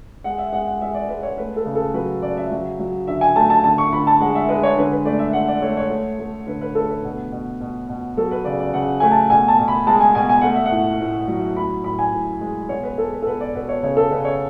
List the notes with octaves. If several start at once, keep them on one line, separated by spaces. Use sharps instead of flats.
G#3 F#5
E5
G#3 F#5
F#5
G#3 E5
D5
G#3 B4
C#5
A3 B4
A4
C#3
A4
F#3 B4
C#3 D5
E5
F#3
F#3
D3 E5
G#5
A3 A5
A5
D3 A5
C#6
D3 B5
A5
G#3 F#5
E5
G#3 B4
C#5
D3 B4
B4
A3 D5
E5
A3 F#5
D5
A3 C#5
C#5
A3
A3
D3 B4
B4
A3 A4
B4
B2
B2
B2
B2
F#3 A4
B4
C#3 D5
D5
C#3 F#5
A3 G#5
A5
B2 G#5
A5
B2
B5
G#3 A5
G#5
B2 G#5
G#5
A3 F#5
E5
F#5
A2
A2
F#3
A2 B5
A2 B5
G#5
A2
G#3
B2 C#5
B4
G#3 A4
B4
A4
B2 B4
D5
B2 B4
C#5
C#3 C#5
A4
C#3 B4
C#5